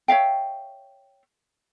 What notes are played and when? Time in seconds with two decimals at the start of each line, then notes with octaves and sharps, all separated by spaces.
0.08 C#5 E5 F5 G5